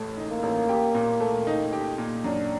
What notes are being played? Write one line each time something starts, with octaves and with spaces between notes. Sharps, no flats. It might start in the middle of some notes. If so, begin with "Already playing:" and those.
Already playing: A1 A2 A3
D#4
A#3
A1
G4
A#2
A3
D#4
G4
A#2
F#2 D4